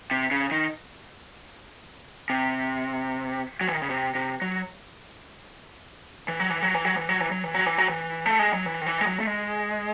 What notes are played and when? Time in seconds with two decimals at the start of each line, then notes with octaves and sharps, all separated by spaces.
0.11 C3
0.31 C#3
0.51 D#3
2.30 C3
3.61 F#3
3.67 E3
3.75 D#3
3.82 C#3
3.90 C3
4.15 C3
4.42 F#3
6.28 E3
6.40 F#3
6.50 E3
6.63 F#3
6.74 E3
6.85 F#3
6.97 E3
7.09 F#3
7.21 E3
7.31 F#3
7.44 E3
7.54 F#3
7.66 E3
7.78 F#3
7.89 E3
8.26 A3
8.39 G#3
8.53 F#3
8.66 E3
8.81 D#3
8.86 E3
9.01 G#3
9.07 F#3
9.20 A3
9.27 G#3